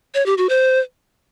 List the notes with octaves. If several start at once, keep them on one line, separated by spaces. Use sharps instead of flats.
C#5
G4
F#4
C5